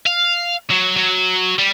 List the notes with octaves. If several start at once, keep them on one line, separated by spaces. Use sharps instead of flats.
F5
F#3
F#3
G3